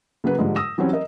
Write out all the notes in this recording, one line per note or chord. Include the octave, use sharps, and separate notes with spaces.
C#3 F#3 A#3 B4
G#2 D3 F3 G3 G#3
D#6 E6 A#6 E7
E3 F#3 G3 C4 C#4
A#4 D#5